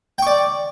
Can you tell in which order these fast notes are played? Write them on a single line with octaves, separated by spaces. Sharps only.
G5 C#6 D5